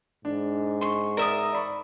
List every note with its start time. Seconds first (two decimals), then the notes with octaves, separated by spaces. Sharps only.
0.25 G#2 D4
0.81 C6 C#6
1.17 A#4 D5 E5 D#6
1.53 D5 B5 C#6